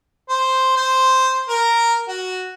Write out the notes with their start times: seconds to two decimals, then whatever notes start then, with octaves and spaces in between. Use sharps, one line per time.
0.29 C5
0.77 C5
1.49 A#4
2.08 F#4